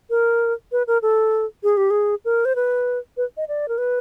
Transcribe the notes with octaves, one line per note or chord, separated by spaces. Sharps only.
A#4
B4
A#4
A4
G#4
G4
G#4
A#4
C5
B4
B4
D#5
D5
A#4
B4